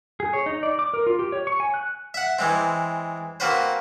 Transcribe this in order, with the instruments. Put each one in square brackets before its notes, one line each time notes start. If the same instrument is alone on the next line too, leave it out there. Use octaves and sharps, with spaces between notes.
[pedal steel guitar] G#4
C#5
D#4
D5
D6
A#4
F4
G4
C#5
C#6
G#5
F#6
[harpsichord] E5 F#5
E3 G#3 C4
A#3 C4 F#4 B4 C5